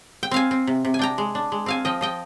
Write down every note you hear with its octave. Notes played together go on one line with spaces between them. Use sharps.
G5
C4 F5 G#5
C4
C3
C3
G#5
D4 G5 A#5
G#3
D4
G#3
C4 F5 G#5
F3 D#5 G5
F3 D#5 G5